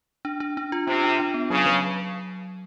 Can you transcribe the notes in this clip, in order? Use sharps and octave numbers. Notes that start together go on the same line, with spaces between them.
D4
D4
D4
F4
C3 D4
D4
D4
B3
C#3 F#3
F#3